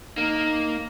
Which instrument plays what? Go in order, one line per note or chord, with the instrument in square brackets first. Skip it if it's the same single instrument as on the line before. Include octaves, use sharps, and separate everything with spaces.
[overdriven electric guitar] A#3 [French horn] D#4